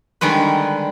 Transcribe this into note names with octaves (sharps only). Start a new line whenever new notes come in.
D3 D#3 G3 G#3 B4